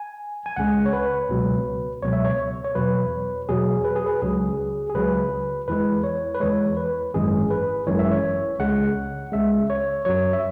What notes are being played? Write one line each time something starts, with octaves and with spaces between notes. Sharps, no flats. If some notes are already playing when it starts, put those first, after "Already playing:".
Already playing: G#5
G#5
C#2 C#3 G#3 F#5
C#5
B4
C#2 B2 F#3
C#2 B2 F#3 C#5
E5
C#5
C#5
E2 B2 F#3 B4
E2 B2 F#3 G#4
B4
G#4
B4
C#2 C#3 F#3 G#4
G#4
C#2 C#3 F#3 B4
E2 E3 G#3 B4
C#5
B4
E2 E3 G#3 C#5
B4
G#1 F#2 E3 G#3 G#4
B4
G#1 F#2 E3 G#3 C#5
E5
C#5
C#2 C#3 G#3 F#5
C#2 C#3 G#3 E5
C#5
F#2 F#3 C#5
E5